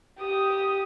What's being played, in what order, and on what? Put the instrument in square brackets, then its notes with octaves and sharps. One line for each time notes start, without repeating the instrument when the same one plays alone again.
[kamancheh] G4 D#6